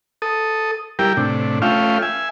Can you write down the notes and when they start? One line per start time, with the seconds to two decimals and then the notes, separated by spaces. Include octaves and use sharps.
0.22 A4 D#6
0.99 G3 E4 G4 A#4 G5
1.17 A2 C3 D4
1.62 A3 C#4 F4 E5 F5 G5
2.02 E5 G#5